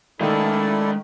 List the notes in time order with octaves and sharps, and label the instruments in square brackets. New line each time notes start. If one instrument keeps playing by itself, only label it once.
[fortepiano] D#3 A3 [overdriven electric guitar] G#3 F5 [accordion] E4 A4 D5